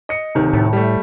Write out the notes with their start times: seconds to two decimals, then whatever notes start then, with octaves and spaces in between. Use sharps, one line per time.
0.09 D#5 C#7
0.35 D1 C3 D#3
0.53 A2
0.73 G3 A3